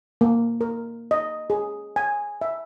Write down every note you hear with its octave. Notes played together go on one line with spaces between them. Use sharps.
A#3
A#4
D#5
G#4
G#5
E5